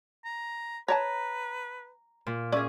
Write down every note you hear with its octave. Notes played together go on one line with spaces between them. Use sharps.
A#5
B4 C#5 D5 A5 A#5
A#2
C#4 G#4 D5 E5